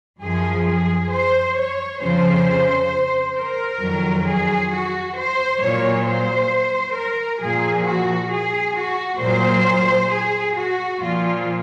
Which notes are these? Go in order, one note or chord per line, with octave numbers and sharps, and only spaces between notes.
F#2 F3 G#4
G#4
C5
C#5
F2 C#3 F3 C5
A#4
F2 D#3 F#3
G#4
F#4
C5
A#2 F#3 C#5
C5
A#4
A#2 F3 G#4
F#4
G#4
F#4
A#2 F#3 C5
G#4
F#4
A#2 F3 F4